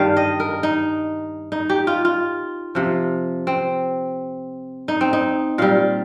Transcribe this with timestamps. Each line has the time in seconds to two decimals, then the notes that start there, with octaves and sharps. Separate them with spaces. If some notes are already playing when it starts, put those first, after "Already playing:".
Already playing: G2 D#3 G3 F5
0.17 D#5
0.40 A#4
0.63 D#4
1.52 D#4
1.70 G4
1.87 F4
2.05 F4
2.75 C3 F3
3.47 C4
4.88 D#4
5.01 C4
5.13 D#4
5.58 A#2 G3 F5